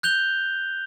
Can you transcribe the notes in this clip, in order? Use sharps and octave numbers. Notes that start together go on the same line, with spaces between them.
F#6 G6 F7 G7